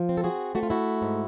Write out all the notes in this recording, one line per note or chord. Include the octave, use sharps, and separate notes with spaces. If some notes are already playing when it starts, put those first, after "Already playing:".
Already playing: F3
C4
A4
F#4 G#4
A3 F#4
F4
E4 F#4
G#2